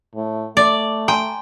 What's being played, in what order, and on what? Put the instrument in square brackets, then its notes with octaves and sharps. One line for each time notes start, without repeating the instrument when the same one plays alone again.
[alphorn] A2
[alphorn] A3 [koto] D5 [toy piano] D6
[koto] G5 [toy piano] G#5 A#5 C6